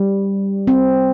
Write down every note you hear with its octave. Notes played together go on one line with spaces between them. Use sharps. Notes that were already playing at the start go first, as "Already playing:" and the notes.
Already playing: G3
C4